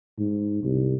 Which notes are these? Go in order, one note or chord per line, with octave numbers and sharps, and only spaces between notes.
G#2
C2